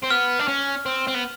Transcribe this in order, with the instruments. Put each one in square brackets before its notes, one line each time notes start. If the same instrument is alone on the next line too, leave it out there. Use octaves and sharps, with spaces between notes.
[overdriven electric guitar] C4
[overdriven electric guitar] B3 [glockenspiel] F6
[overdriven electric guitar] D4
C#4
C4
C4
B3